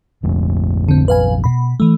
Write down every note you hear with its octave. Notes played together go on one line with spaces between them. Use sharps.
F1 A#1 F2
D3 C4
B4 F5 G#5
B2 B5
E3 A3